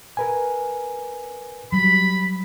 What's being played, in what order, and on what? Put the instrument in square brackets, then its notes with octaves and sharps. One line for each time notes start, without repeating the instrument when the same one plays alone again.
[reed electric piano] A#4 B4 G#5
[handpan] F#3 G3 [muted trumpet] B5